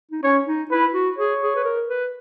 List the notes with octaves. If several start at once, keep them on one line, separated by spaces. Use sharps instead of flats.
D#4
C#4 C#5
D#4
E4 B4
F#4
G#4 C#5
G#4
B4
A#4
B4